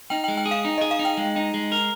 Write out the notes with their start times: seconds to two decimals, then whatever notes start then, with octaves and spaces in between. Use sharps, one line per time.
0.10 D#4 G5
0.24 G5
0.28 G#3
0.37 G5
0.46 G#4
0.51 F5
0.65 D#4
0.78 D#5
0.81 G#4
0.91 F5
0.99 D#4
1.05 G5
1.17 G#3
1.36 D#4
1.54 G#3
1.72 A#4